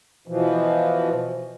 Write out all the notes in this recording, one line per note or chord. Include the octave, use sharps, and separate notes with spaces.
B2 E3 F3